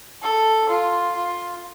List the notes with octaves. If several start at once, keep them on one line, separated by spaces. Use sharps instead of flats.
A4
F4
F4